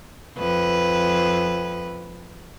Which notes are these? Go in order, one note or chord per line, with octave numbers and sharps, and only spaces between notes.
F2 B4